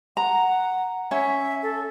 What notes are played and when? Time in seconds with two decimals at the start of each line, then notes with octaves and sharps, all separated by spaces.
0.17 F#5 A#5
1.11 C#4 C#5 E5
1.63 A4